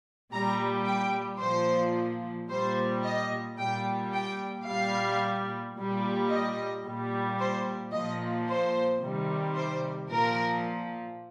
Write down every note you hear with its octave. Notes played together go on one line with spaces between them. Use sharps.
A#2 G3 A#5
G5
A#2 F3 C5
A#2 G3 C5
D#5
A#2 G3 G5
G5
A#2 G3 F5
A#2 G3
D#5
A#2 G3
C5
A#2 F3 D#5
C5
C3 D#3 G3
C5
A#2 F3 A#4